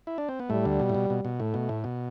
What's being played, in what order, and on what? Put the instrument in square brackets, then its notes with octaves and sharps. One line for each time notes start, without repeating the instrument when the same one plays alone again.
[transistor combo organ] E4
D4
C4
B3
[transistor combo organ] A2 A3 [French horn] G3
[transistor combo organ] D2 D3
B2
A2
B2
B2
B2
[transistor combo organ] A2 [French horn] A3
[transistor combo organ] B2
A2
B2